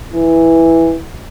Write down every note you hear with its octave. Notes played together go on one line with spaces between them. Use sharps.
E3